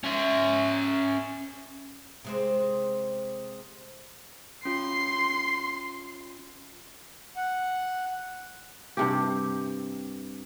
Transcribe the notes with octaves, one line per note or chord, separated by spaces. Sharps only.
C#4 E5
C3 G#3 C4
C#4 F4 C6 C7
F#5
G2 C3 G4